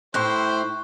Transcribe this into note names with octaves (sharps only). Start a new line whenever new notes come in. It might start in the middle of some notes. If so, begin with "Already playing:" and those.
A2 E4 G4 C5 C#6 F#6